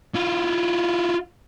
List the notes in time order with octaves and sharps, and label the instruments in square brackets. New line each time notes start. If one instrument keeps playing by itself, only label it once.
[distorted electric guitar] E4 F4